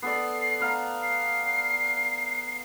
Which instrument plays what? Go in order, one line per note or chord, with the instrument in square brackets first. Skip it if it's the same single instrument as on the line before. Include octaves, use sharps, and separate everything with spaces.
[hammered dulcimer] B3 A4 D5 [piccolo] C7
[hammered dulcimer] B3 F5 A#5
[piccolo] C7